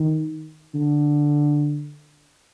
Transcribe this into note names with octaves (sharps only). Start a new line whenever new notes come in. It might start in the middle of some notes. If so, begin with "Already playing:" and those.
Already playing: D#3
D3